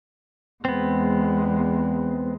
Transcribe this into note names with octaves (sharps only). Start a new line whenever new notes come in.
E2 G#3 B3 C4